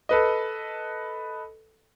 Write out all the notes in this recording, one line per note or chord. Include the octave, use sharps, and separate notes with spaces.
A4 B4 D#5